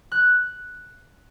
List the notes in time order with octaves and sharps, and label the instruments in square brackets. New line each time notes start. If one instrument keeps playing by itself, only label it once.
[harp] F#6